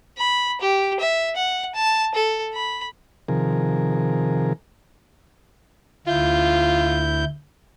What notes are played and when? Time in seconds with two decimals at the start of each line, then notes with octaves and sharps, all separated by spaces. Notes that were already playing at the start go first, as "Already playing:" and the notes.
0.18 B5
0.61 G4
1.00 E5
1.36 F#5
1.75 A5
2.15 A4
2.54 B5
3.28 C3 D#3 F3 G#4 A#4
6.07 D2 E4 F4 G6